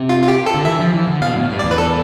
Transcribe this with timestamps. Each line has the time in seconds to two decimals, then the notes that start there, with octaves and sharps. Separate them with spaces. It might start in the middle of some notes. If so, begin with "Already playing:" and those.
Already playing: C3
0.09 F4
0.22 F4
0.28 G4
0.46 A4
0.54 D3
0.65 E3 E5
0.80 F3
0.94 E3
1.08 D3
1.22 B2 F5
1.36 A2
1.50 G2
1.59 E2 D5
1.71 B4
1.78 A4